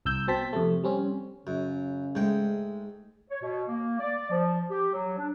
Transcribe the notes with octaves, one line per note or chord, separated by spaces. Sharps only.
C2 E6 G6
B2 C4 A5 B6
F2 C3 A3
G3 C4 C#4
F#2 C#3
G#2 G#3 A3 G5
C#5
B2
A#3
D5
F3
G4
F#3
D4